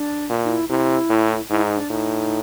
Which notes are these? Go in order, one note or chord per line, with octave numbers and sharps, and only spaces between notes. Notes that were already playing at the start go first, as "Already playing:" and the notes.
Already playing: D4
A#2
D#4
E4
C3 E4
A2
G#2 E4
D#4
D4
A2 D#4